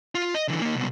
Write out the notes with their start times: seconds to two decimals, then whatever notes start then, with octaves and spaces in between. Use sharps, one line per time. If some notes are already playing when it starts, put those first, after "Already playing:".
0.15 F4
0.34 D#5
0.48 D3 E3
0.62 A#3 D#4
0.75 C2 B2